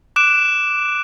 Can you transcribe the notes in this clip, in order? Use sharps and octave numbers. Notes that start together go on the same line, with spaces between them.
D6 F#6 D7 E7